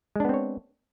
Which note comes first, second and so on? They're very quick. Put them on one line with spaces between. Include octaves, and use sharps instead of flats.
G#3 D4 B3 C4 C#5